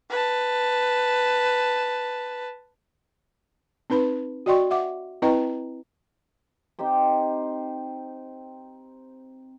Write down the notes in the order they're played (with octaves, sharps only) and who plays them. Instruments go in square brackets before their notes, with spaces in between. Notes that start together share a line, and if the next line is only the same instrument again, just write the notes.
[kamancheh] B4 A5
[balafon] C4 D#4 B4 B5
F#4 D5 D#5 G5 C6 C#6
E5 F#5 D6
C4 E4 B4 D#5 G5 A#5
[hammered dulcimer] C4 D#4 G4 C5